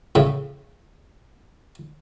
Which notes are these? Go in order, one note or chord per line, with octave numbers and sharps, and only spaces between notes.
A2 C#3